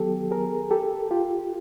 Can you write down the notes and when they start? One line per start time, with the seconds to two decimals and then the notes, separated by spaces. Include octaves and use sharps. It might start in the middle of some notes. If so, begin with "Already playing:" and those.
Already playing: D#3 F#3 B3 G4 A4
0.31 G#4 A#4
0.71 G4 A4
1.11 F4 G4